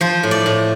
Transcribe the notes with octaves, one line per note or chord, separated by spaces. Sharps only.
F3 C5
A2
D5
A2